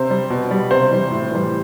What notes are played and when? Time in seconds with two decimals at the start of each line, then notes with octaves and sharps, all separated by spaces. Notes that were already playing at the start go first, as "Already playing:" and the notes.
Already playing: C3 C5
0.10 G3
0.30 B2
0.51 G3
0.71 C3 C5
0.91 E3 G3
1.11 A2
1.31 E3 G3